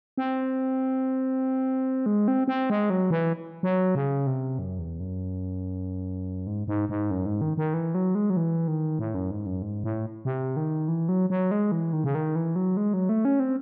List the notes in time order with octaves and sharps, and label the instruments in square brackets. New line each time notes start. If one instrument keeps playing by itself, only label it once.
[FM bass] C4
G#3
C4
C4
G#3
F#3
E3
F#3
C#3
C3
F#2
E2
F#2
G#2
G#2
G#2
F#2
G#2
D#3
D#3
E3
F#3
G#3
F#3
E3
D#3
A2
F#2
G#2
F#2
G#2
A2
C3
D#3
E3
F#3
F#3
G#3
E3
D#3
C#3
D#3
E3
F#3
G#3
F#3
A3
C#4
C4